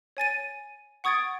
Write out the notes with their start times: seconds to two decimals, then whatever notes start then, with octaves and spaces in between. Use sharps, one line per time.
0.17 C#5 G#5 A6 D#7
1.04 F#5 C#6 D#6 G#6 A6 D7